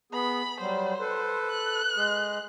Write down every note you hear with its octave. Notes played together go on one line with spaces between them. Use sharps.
B3 G#4 B5
F#3 G3 C5
A4 B4
F#6
G#3 G#4